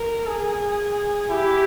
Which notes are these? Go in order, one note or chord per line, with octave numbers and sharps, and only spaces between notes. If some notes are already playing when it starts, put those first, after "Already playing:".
Already playing: A#4
G#4
E4 G4